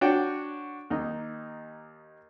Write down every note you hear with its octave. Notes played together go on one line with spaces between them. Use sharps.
D4 F#4 C#5 G5
D#2 D#4